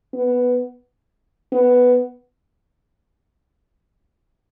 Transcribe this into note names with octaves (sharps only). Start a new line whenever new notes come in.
B3
B3